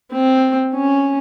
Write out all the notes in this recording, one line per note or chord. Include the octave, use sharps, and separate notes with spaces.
C4
C#4